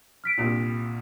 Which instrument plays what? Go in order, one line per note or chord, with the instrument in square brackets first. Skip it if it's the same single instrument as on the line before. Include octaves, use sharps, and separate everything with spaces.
[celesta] F6 B6 D7
[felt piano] C2 G2 A#2